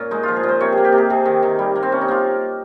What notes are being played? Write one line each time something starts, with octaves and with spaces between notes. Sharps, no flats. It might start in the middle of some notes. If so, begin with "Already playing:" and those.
Already playing: A#2 C#4
G#3 D#4
F3 F4
G#4
A#2
C5
C3 C#5
A#3 G#4
G4
C3
G#4
C3 G#4
D#3
D#3
G3
A#3
C4
C3 C#4
D#4
A#3 F4